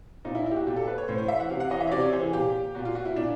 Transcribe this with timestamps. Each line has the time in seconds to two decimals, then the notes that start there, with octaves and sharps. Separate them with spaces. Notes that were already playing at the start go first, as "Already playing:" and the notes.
0.25 A#2 D#4
0.35 E4
0.46 E4
0.51 G4
0.56 F#4
0.67 A#2 G4
0.76 A4
0.87 B4
0.98 C#5
1.08 A2 C5
1.18 C5
1.28 E3 E5
1.40 F#5
1.50 C3 F5
1.60 F#5
1.70 E3 D#5
1.81 E5
1.87 C#5
1.91 C3 D5
2.02 C#5
2.12 E3 C5
2.22 G#4
2.33 A#2 G4
2.75 A#2 F#4
2.85 F4
2.95 F#4
3.05 E4
3.16 A#2 D4